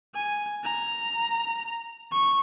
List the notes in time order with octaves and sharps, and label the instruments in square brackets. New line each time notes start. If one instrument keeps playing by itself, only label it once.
[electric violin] G#5
A#5
C#6